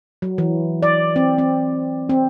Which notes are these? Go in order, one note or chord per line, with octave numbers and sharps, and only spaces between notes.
F#3
E3
D5
C4
C4
C4